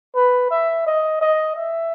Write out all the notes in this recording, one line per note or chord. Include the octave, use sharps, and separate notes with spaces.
B4
E5
D#5
D#5
E5